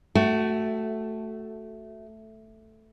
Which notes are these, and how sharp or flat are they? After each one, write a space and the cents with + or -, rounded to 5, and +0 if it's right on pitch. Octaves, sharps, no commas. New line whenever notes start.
A3 +0 F#4 +0 F#5 +40